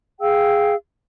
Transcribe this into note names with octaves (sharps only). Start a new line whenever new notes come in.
G#4 F5 G5 E6